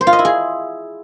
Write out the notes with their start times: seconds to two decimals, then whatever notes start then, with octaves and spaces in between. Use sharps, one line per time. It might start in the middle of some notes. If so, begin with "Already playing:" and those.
0.01 C5
0.07 F4
0.13 D#5
0.19 E4
0.25 G#4